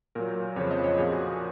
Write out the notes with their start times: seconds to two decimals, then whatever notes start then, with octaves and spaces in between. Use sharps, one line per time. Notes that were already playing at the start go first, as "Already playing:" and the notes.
0.15 A#2 F#3 A#4
0.56 F2 C#3 F3 C#5
0.71 D#5
0.84 C#5
0.98 A#2 F3 G#4
1.12 F#4